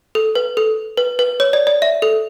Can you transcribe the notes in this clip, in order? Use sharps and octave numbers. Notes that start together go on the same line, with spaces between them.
A4
B4
A4
B4
B4
C#5
D5
D5
E5
A4